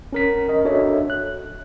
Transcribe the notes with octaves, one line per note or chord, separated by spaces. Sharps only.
C#4 A#4 B6
A#4 D#5
D4 F#4 A4 C#5 D#5 E5
F#6